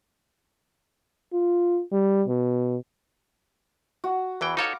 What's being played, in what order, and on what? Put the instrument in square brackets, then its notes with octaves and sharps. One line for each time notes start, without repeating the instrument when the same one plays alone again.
[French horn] F4
G3
B2
[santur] F#4
[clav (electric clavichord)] E2 E3 G5 [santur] B4
[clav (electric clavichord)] D#4 A4 C#5 [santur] F5 A#5 D6